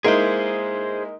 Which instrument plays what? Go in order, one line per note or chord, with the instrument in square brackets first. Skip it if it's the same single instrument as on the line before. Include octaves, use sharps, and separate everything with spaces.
[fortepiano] G#3 A#3 E4 [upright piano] D#4 A#4 D7 [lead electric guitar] G#4 C5